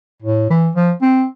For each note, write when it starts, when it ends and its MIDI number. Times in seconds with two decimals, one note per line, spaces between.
0.22 0.48 45
0.50 0.69 52
0.75 0.92 53
1.02 1.25 60